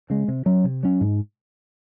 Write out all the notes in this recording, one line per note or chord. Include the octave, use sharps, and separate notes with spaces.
C#3 G#3
C3
F#3 C#4
C3
F#3 C#4
G#2